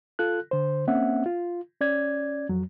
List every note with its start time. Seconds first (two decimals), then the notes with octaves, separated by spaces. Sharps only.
0.19 F4 A4 F#6
0.51 D3 C5
0.87 A#3 C4 C#4 E5 F#5
1.26 F4
1.81 C#4 D5 G#6
2.49 F2 F#3